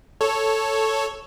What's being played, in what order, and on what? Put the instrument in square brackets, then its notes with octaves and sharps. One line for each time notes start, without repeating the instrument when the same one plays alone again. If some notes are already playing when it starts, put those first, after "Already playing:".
[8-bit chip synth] A4 C#5